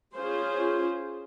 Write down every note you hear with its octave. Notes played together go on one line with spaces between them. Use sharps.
C#4 F4 G#4 C5